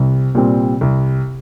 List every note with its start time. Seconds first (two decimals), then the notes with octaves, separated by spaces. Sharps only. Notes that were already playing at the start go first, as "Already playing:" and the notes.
Already playing: C2 C3
0.35 A#2 G3 C4
0.81 C2